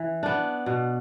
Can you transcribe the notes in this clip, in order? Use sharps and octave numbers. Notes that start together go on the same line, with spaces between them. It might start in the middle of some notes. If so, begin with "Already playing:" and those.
Already playing: E3
B3 D4
B2